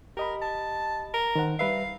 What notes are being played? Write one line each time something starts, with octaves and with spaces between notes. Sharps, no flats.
G4 A#4 D#5 B5
A5
A#4
D#3 C5 F#5
G3 B4 E5 F5